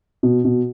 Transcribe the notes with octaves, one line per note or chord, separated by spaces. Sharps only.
B2
B2